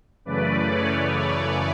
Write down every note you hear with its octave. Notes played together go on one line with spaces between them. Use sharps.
F#2 C#3 E3 A3 B4 D5
C#5
B4 D5